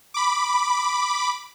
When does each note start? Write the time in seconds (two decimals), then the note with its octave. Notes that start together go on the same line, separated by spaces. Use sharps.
0.14 B5 D6